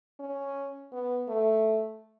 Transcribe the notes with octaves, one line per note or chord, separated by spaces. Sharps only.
C#4
B3
A3